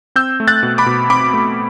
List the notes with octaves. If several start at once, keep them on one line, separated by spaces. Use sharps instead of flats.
C4 E6 G6
A3
F#6 A6
B2
B5 D6
B2
C4 B5 D6
A3